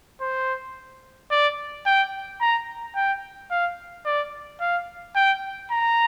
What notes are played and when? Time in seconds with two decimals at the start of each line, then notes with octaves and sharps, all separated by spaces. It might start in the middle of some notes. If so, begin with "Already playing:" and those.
0.21 C5
1.31 D5
1.86 G5
2.41 A#5
2.96 G5
3.51 F5
4.06 D5
4.60 F5
5.16 G5
5.71 A#5